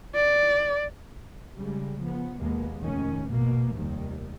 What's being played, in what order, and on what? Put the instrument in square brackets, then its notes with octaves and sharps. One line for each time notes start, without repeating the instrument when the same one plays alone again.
[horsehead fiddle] D5
[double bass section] C#3 G3 G#3
F3 B3
D#2 B2 G#3 A#3 B3
F1 D#3 C#4
G#1 B2 A#3
F1 D#2 D#3 G3